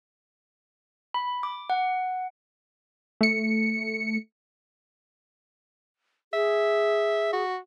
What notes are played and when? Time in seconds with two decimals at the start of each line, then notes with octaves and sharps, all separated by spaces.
1.14 B5
1.43 D6
1.70 F#5
3.21 A3 C#7
6.33 G#4 E5
7.33 F#4